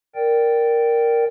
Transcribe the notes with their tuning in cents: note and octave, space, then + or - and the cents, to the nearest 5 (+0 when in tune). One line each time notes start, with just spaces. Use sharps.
A#4 +0 D5 +0 G5 -10